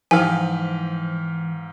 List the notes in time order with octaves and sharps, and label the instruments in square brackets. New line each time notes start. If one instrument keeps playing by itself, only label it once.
[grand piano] G#2 G4 F5 [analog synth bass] E3 [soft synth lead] F3 [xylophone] G#5